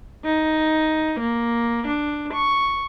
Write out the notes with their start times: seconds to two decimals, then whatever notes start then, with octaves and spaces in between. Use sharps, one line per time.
0.24 D#4
1.20 A#3
1.86 D4
2.33 C#6